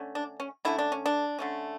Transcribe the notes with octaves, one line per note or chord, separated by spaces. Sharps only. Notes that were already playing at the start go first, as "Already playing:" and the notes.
Already playing: D3 A3 C#4
D4
C#4
D3 A3 C#4 E4
D4
C#4
D4
D3 A3 C#4